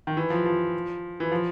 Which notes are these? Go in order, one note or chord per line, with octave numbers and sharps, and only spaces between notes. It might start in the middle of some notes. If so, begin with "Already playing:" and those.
D#3
E3
F3
F3
E3
F3